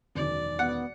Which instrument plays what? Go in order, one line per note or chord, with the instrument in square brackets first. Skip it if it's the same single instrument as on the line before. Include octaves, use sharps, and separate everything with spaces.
[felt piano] E1 F#2 D#3 [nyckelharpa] D5
[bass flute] B3 [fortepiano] F#5